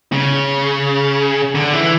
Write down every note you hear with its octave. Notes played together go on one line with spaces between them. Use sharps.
C#3
D3
E3